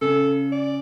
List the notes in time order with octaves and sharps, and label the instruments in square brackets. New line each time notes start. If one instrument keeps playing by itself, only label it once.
[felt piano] C#3 [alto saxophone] A4
[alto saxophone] D5